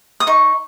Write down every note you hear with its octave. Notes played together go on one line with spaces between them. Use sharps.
D#6
D#4 C#6